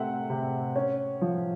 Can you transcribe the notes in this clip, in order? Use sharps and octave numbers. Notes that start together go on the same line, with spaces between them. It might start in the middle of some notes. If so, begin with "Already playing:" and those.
Already playing: C3 A3 C4 E5 F#5
C3
C#4
F3